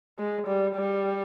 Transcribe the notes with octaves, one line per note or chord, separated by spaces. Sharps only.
G#3
G3
G3